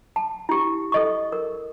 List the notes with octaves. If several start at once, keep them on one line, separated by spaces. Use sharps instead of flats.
A5
E4 G4
A4 D#5 C#6
A#4